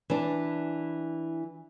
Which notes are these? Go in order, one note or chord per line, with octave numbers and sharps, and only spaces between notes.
E3 D4